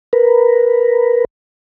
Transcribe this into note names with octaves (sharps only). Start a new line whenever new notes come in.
A#4 B4